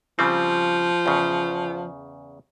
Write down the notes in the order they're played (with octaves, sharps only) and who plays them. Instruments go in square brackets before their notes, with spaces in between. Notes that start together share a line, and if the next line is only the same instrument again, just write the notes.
[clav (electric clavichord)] C#3 G3 C4 [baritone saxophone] F3
[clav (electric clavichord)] E2 C#3